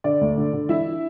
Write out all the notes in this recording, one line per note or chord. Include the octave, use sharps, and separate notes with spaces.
D3 D5
D2
D3
D3
E3 E4 E5